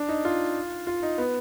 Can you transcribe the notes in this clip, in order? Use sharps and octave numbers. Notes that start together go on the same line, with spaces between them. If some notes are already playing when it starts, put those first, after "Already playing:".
Already playing: D4
D#4
F4
F4
D#4
B3